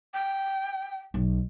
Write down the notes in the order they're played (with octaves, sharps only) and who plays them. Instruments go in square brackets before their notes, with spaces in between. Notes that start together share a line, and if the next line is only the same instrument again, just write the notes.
[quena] G5
[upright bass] B1